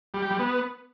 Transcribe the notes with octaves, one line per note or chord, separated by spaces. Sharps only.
G3
G4
G3
B3